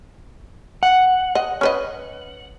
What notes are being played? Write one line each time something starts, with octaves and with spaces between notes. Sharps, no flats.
F#5
D#5
C#4 B4 D#5